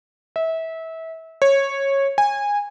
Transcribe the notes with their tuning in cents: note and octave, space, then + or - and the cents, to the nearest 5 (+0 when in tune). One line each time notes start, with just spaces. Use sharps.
E5 -25
C#5 -15
G#5 -20